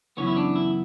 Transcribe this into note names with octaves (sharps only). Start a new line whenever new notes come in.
F#2 C#3 E3 B3 C#4 C#5
E4
D4
E4